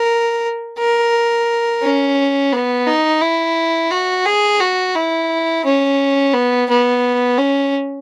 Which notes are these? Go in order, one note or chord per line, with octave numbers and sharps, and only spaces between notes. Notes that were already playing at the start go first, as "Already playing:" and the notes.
Already playing: A#4
A#4
C#4
B3
D#4
E4
F#4
G#4
F#4
E4
C#4
B3
B3
C#4